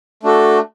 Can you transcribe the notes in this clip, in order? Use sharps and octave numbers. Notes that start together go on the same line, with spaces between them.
A3 D4 F#4 A4